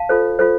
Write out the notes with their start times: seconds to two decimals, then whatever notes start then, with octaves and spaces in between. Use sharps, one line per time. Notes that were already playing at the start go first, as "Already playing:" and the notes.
Already playing: F5 A5
0.09 F4 A4 C5
0.39 F4 A4 C5